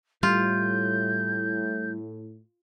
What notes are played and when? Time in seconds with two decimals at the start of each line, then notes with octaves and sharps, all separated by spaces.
0.23 A2 G3 F4 G6